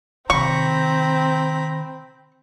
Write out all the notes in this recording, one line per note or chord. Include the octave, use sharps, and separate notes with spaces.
C3 D#3 C4 A#5 B5 C#6